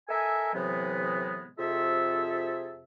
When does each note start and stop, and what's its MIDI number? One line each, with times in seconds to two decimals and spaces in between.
0.09 0.50 69
0.09 0.50 70
0.09 0.50 75
0.09 0.50 76
0.09 0.50 80
0.54 1.49 45
0.54 1.49 48
0.54 1.49 52
0.54 1.49 54
0.54 1.49 56
0.54 1.49 59
1.59 2.84 41
1.59 2.84 48
1.59 2.84 65
1.59 2.84 68
1.59 2.84 69
1.59 2.84 76